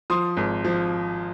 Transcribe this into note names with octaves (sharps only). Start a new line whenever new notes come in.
F3 C6 D#6
G#1
F3